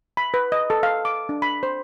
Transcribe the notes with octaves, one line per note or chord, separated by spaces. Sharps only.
B5
B4
D#5
A4
F5
D6
D4
B5
C5